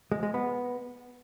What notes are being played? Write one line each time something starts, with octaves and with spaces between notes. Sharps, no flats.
G#3
G#3
B3